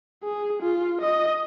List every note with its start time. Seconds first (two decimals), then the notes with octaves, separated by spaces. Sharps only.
0.23 G#4
0.62 F4
1.01 D#5